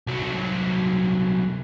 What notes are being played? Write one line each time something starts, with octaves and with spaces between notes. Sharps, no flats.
C2 F#3